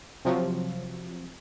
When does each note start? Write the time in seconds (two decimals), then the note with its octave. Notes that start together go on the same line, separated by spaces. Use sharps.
0.25 C3 F3 F#3